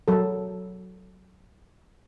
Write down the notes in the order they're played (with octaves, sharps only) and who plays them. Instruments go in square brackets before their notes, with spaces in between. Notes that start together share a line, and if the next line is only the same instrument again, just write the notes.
[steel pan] F#3 A4